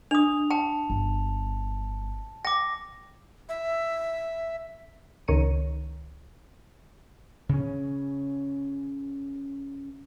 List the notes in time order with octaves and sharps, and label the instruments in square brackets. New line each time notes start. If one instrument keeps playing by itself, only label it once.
[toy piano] D4 D#6 [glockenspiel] F7
[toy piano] G5 [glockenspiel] A5
[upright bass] G1
[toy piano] G5 [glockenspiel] D6 A#6
[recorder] E5
[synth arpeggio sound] C#2 D#3 C#5 A#5 C#7 D#7
[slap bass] C#3 C#4